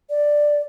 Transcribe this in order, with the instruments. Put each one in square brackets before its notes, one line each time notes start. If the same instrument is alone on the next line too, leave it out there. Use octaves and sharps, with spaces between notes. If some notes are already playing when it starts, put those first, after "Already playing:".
[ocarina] D5